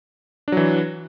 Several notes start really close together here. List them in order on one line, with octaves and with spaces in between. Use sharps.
D4 F#3 E3